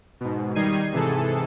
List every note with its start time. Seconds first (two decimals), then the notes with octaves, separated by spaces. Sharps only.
0.21 G#2 B2
0.55 D#3 G3 D#4 G#6 C7 D#7
0.92 G#2 C3 E3 G#4 A4